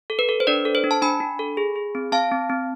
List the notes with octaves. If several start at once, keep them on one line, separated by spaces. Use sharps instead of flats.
A4
B4
A4
C5
D4 B4 D5
A4
C5
D4
A5
D4 G#5 B5
D4
A4
G#4
G#4
C4
C4 F5 A5
C4
C4